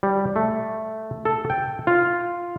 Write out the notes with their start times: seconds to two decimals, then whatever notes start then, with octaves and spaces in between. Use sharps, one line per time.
0.03 G3
0.36 A3
1.25 A4
1.50 G5
1.87 F4